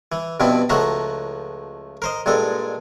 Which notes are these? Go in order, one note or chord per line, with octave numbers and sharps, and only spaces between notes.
E3
G2 B2 F3 C4 E4
C#2 F3 A3 F#4 A5 A#5
A#4 C5 D#5
G2 A#2 G#3 A4